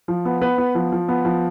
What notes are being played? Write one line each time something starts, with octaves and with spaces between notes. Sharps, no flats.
F3
B3
B3 B4
B3
F3
F3
B3
F3